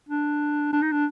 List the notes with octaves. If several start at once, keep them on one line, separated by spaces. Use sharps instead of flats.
D4
D4
D#4
D4